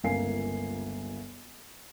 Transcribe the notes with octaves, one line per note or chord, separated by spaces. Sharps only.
G1 C#2 A#3 F5 G#5 C7